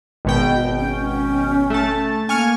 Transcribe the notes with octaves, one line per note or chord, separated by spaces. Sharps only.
G#1 B2 G5
C#4
A3 A5
A#3 G#5 C#6 F6